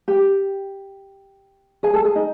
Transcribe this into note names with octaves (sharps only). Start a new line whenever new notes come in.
G4 G5
G#4 G#5
A4 A5
G#4 G#5
D#4 D#5